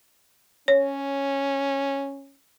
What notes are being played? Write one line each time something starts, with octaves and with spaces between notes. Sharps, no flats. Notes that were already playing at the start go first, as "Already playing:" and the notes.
C#4 C#5